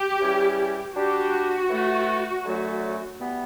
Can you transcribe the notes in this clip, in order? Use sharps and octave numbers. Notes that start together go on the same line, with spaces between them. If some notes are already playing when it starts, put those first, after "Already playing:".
Already playing: G4
C#3 E3 G3 C#4 E4
G3 D4 F#4 G4
A2 E3 A3
F#2 D3 F#3 A3 C#4
E3 G3 B3